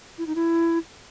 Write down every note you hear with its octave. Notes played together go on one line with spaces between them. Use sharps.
E4
D#4
E4